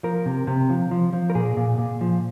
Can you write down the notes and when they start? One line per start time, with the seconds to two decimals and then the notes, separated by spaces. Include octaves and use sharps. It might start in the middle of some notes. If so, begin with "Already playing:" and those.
0.03 F3 A#4
0.26 C3
0.47 C3
0.70 F3
0.91 F3
1.13 F3
1.30 A#4
1.35 A#2 G#4
1.57 A#2
1.78 A#2
2.01 F3